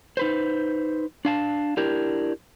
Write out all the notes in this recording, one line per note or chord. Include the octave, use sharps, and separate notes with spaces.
D#4 B4 C5
D4 F5 A5
D4 E4 G4 A#4